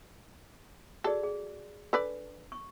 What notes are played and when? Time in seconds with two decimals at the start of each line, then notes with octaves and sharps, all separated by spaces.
1.04 F#4 G#4 A4 D5
1.23 G#4
1.93 D4 A4 B4 D5
2.52 C#6